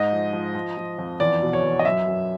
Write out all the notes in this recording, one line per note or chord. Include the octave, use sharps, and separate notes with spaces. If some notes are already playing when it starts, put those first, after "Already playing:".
Already playing: G#2 D#5
F3
F3
F3
F3
F2
E2 D5
B2
C#5
E2
D#5
F#2 E5
F#2